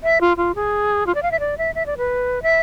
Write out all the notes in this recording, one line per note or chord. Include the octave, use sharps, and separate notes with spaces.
E5
F4
F4
G#4
F4
D5
F5
E5
D5
E5
E5
D5
B4
E5